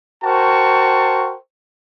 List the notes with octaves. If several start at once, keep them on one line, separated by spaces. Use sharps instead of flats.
F#4 A#4 C5 G5 A5 C#6